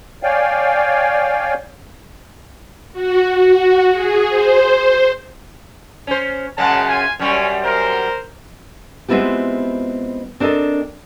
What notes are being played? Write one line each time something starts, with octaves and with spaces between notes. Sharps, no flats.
C#5 D5 F5 G5 G#5
F#4
F#4
G#4
C5
C#4 C5
F#2 C#3 G#3 C#4 F#5 A5
F4 G#5
F#2 G3 C#4
A#4 C5
G#3 B3 C4 E4 F4 G4
C4 D4 A4 A#4 D#5